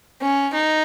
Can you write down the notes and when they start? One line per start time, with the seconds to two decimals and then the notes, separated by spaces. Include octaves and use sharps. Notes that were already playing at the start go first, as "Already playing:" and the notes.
0.22 C#4
0.53 D#4